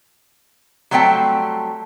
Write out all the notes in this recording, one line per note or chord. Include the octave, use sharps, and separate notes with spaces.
F#3 G3 A3 C4 G5 A5